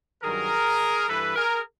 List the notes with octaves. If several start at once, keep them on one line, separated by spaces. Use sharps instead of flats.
G2 D#3 F#3 G#4 A#4
G2 E3 A4 B4
G#4 A#4